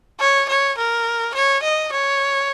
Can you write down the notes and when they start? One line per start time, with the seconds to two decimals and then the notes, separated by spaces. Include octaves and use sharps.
0.20 C#5
0.49 C#5
0.78 A#4
1.35 C#5
1.63 D#5
1.92 C#5